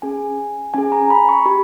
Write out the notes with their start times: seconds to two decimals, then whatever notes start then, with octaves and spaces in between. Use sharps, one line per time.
0.02 C#4 G#4 G#5
0.74 C#4 G#4 G#5
0.92 A#5
1.10 B5
1.29 C#6
1.46 G4 B5